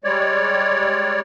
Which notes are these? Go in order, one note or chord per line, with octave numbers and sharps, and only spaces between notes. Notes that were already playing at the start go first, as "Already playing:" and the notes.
G3 G#3 C#5 D5